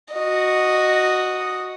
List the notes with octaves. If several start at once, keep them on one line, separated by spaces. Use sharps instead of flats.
F#4 D#5